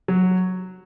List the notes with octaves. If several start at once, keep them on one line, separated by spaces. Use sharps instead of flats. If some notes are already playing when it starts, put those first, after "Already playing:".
F#3